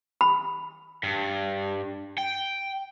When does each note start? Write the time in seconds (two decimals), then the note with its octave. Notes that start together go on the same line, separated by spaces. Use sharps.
0.21 B5
1.03 G2
2.18 G5